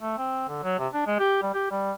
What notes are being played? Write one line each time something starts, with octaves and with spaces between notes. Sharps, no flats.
A3
C4
D3
F#3
C3
D4
G#3
G4
G3
G4
G3